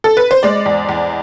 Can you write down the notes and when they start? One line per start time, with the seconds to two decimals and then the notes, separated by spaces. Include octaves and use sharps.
0.04 A4
0.17 B4
0.31 C5
0.43 G#3 D5
0.66 E2
0.89 E2